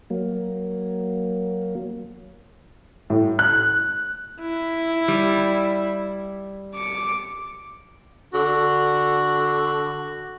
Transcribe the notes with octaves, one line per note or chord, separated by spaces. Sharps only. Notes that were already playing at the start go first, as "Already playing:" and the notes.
F#3 A#3
A2
F#6
E4
G3
D6 C#7
D3 F#4